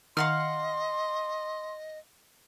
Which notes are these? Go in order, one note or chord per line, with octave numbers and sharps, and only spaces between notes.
D#3 D#5 F5 F#5 C6 F6